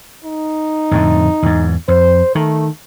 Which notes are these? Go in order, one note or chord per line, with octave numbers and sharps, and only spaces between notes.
D#4
F2 A2 D3
E2 G#2
F2 C5
D#3 A3